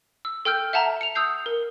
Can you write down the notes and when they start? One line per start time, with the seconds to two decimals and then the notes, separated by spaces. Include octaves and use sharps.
0.25 E6
0.45 A4 G5 E6 F6 G6
0.73 E5 F#5 A5 A#5
1.01 C#7 F7
1.15 D#6 E6 G6 C7
1.46 A#4